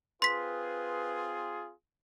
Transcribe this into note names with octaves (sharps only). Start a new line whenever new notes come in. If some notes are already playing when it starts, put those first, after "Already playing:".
C4 F4 G#4 B4 C6 B6